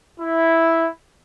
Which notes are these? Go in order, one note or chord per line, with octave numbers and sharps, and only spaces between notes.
E4